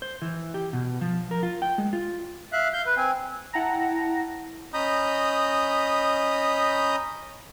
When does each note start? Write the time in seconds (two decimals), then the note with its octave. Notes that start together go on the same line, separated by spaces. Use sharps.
0.02 C5
0.22 E3
0.54 G4
0.73 B2
1.01 F3
1.31 A#4
1.43 F4
1.62 G5
1.78 G#3
1.93 F4
2.52 E5 F5 F#6
2.74 F5 G6
2.86 B4
2.97 C4 G#5
3.53 E4 F#5 G5 A5 A#5 A#6
4.74 C#4 D#5 A#5 B5 D#6 G6